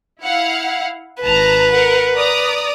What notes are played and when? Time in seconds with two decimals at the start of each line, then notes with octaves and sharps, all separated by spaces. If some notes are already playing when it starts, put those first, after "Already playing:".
0.23 E4 F5 F#5
1.23 G#1 B4 A5 A#5
1.70 A#4 F#5
2.16 D5 A#5 D#6